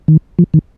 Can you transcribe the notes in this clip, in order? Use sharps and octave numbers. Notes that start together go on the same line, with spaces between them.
D#3
F3
D#3